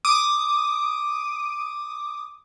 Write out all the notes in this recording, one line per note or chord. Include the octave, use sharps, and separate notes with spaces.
D6 D#6